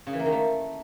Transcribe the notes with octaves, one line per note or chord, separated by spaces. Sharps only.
C#3
E3
A#3
D#3
A3